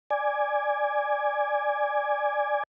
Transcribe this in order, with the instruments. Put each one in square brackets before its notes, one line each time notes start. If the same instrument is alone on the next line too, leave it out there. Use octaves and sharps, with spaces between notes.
[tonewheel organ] D5 G#5